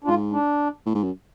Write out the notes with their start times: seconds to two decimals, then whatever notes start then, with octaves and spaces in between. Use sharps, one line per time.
0.04 D4
0.07 G#2 F4
0.32 D4
0.86 A2
0.95 G#2
1.04 F#2